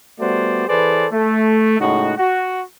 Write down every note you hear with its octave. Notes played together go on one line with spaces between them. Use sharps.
G3 A3 B3 F#4 C5 D5
E3 G#4 A4 B4 C5 D5
A3
A2 C#3 G#3 D#4 F#4
F#4